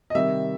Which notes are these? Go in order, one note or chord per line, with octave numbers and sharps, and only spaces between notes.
D#5
C3 D#3 G3 E5